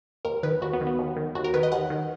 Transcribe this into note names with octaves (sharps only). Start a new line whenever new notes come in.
D#2 A#4
D#3 B4
D#2 F#4
B3
D#3
B3
D#2
D#3
D#2 F#4
A#4
D#3 B4
D#5
D#2 F#5
D#3